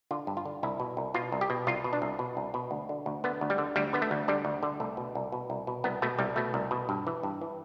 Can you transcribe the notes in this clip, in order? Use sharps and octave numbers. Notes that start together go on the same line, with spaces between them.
D3 F4
G2
F4
D3
C2 E4
B2
C2
B2 F4
C2
G4
B2
C2 F4
B2
D4
C2
B2
C2
B2
D2
D3
D2
D3 B3
D2
G3
D3
D2 G3
D3 B3
A3
D2
D3 G3
D2
D3
C2 A3
B2
C2
B2
C2
B2
C2 B3
B2 A3
C2 G3
B2 A3
C2
B2
G2
E3
G2
E3